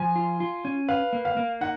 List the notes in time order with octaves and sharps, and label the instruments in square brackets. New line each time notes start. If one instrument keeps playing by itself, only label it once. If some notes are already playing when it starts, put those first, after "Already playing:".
Already playing: [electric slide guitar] F3 [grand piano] G#5
[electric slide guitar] F4
F4
C#4
[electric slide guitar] B4 [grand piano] F5
[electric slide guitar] A#3
[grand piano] F5
[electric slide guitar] A#3
[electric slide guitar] D#4 [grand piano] F#5